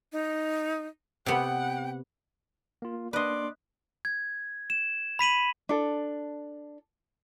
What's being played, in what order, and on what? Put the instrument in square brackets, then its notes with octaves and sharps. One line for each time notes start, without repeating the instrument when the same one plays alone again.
[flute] D#4
[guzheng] C3 B3 [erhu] F#5 [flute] G5
[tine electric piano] A#3 F4
[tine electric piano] A#3 D4 C6 [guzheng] B4 D#5 [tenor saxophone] D5
[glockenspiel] G#6
E7
B5 B6 D#7 F#7
[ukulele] D4 A4